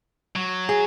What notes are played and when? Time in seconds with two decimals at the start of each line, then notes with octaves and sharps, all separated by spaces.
0.36 F#3
0.69 G#4